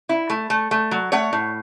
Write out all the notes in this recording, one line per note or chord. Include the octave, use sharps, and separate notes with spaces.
E4
A3
A3
A3
F#3
A3 C#5 F#5
A2